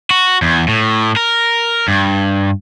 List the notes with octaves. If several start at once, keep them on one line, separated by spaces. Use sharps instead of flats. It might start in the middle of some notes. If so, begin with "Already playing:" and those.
F#4
E2
A2
A#4
G2